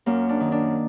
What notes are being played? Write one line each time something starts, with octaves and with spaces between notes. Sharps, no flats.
F#2 A#3
D4
D#3
D4